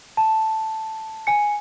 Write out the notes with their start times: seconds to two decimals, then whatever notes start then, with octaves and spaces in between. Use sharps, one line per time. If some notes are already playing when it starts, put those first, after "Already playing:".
0.17 A5
1.27 G#5 C#7